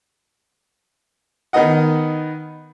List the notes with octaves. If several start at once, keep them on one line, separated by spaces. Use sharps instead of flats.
D#3 B3 D#4 D#5 F#5